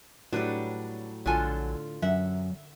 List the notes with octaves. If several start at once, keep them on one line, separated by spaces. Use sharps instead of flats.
A2 F#3 G3 D4 B4
A#1 D3 F#3 F4 A4 G#5
F#2 F#3 E5 F#5